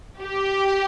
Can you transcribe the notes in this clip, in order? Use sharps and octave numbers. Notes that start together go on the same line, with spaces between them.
G4